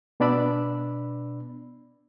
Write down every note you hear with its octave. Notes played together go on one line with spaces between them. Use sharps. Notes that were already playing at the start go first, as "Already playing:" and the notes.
B2 B3 D4 D5 B5 E6